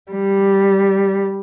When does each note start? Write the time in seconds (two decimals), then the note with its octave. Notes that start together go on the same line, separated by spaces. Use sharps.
0.10 G3